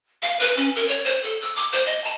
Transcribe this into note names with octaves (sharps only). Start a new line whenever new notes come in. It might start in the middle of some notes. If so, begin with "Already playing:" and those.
F5
B4
C#4
A#4
C#5
C5
A4
E6
D6
C5
D#5
A5